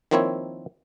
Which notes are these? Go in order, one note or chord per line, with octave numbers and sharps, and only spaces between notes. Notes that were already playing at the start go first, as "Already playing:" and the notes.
D#3 F3 A#3 C4 E4 C#5